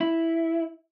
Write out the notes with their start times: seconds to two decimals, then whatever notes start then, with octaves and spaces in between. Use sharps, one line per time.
0.01 E4